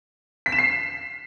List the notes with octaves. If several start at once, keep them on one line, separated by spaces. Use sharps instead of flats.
B6
E7
C7